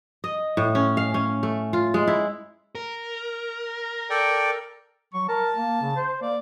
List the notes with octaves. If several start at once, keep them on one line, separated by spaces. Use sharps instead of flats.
D#5
A2
C#4
F5
C#4
A3
F4
G#3
E4
A#4
A4 D5 G5
F#3 C#6
A#4 A5
A#3
C#3
C5
A#3 D5